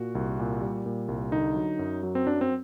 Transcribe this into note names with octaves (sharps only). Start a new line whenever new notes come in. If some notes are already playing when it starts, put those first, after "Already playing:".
Already playing: A#2 F#4
C2
A#2
G3
A#2
C2
D3 D#4
F#3
F#2
F#3
C4
F#2 D4
C4